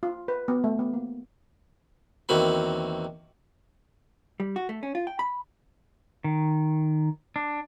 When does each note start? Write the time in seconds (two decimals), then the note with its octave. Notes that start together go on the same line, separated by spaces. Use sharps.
0.03 F4
0.28 B4
0.48 B3
0.64 A3
0.79 B3
0.94 A#3
2.29 E2 D#3 A#3 C4 F#4 B5
4.40 G3
4.56 F#4
4.69 A3
4.83 C#4
4.95 F4
5.07 G5
5.19 B5
6.24 D#3
7.36 D4